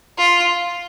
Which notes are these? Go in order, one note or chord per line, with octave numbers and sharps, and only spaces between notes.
F4